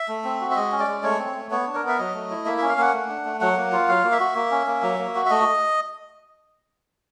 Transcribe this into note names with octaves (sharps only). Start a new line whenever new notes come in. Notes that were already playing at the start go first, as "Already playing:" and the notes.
Already playing: E5
A3
C4
F#4
E5
G#3 D#5
C#4
D5
G#3
A3 C#5
C4
A3
B3 C#5
D4
A#4
B3 E5
F#3 D#5
A3
E4
A#3 E5
C#4 E5
F5
A#3 F#5
A3
D4
A3
F#3 F#5
A#3
F4
F#3 F5
A#3
E5
F#4
A#3
C#4
A#3
F#3
A#3
F#4
E5
A3 D#5